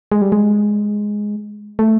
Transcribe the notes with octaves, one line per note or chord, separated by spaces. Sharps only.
G#3
G3
G#3
A3